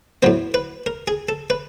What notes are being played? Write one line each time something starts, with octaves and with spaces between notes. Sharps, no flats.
A2 F#3 B3 C5
B4
A#4
G#4
A4
B4